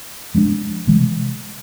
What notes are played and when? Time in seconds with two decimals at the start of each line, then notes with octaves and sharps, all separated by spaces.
0.35 F3 G#3 B3 D4
0.87 C3 E3 G#3